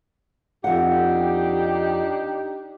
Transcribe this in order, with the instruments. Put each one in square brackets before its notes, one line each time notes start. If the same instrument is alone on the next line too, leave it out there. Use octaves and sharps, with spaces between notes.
[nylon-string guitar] F2 F#5 [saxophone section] D4 D#4 G4